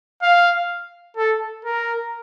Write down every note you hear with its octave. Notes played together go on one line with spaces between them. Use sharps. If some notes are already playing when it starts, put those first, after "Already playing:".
F5
A4
A#4